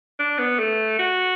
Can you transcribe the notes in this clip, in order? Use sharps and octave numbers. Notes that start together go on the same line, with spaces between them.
D4
B3
A3
F#4